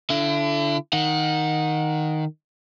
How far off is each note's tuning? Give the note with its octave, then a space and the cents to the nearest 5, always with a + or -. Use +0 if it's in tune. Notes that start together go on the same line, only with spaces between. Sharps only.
D3 -15 E4 +40
D#3 +0 F#5 -25